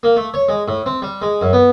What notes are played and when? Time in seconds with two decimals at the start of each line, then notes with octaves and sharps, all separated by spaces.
0.03 A#3
0.17 A3
0.34 C#5
0.49 G#3
0.68 A2
0.86 C4
1.02 G3
1.22 G#3
1.41 F#2
1.53 B3